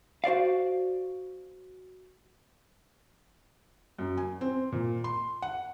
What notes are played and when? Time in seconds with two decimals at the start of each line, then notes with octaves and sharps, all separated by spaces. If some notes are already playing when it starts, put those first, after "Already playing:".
0.24 F#4 C5 D5 F5
3.99 F#2
4.17 G#5
4.41 C4
4.72 A#2
5.04 C6
5.42 F#5